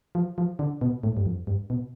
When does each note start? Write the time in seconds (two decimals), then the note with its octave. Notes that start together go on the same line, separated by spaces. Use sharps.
0.15 F3
0.38 F3
0.59 D3
0.81 B2
1.03 A2
1.17 G2
1.26 F2
1.47 G2
1.70 B2